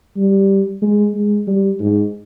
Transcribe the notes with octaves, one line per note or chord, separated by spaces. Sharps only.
G3
G#3
G#3
G3
G#2